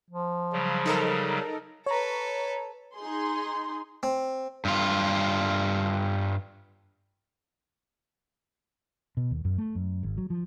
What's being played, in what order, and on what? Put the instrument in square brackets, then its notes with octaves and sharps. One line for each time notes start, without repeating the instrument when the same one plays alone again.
[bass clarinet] F3
[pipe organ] C#3 F#3 G3
[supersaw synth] D#4 A4 A#4
[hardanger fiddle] A4 B4 [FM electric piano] C#5 A#5
[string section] D#4 G#4 C6
[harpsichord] C4
[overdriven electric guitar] G2 F4
[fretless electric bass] B2
D#2
F#2
A3
F#2
G#1
F#3
F3